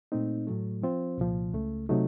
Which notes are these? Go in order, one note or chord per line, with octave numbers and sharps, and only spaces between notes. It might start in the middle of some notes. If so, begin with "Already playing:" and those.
A#2 A3 C4 D#4
A2 F#3 A3
F3 C4 F4 C5
C2 A#2 F3
C#2 C#3 A3
C3 F#3 A3 D#4